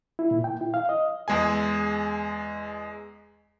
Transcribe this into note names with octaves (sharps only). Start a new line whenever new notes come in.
E4
A#2
G5
E4
F5
D#5
E2 G#3 G#4 G#5